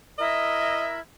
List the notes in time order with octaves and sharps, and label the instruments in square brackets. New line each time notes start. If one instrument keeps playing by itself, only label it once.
[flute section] E4 A#4 E5 [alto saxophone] D#5